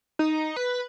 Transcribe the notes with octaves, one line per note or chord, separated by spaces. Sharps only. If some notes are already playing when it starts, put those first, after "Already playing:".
D#4
B4